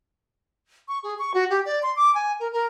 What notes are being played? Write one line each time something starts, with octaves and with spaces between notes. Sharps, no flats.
C#6
G#4
C#6
F#4
G4
D5
C6
D6
G#5
A#4
A#4